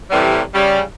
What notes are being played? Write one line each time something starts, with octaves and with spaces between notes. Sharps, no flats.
A2 C3 E3 G3
C#3 G3